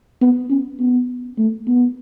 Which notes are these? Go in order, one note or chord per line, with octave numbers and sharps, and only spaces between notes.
B3
C#4
B3
A3
B3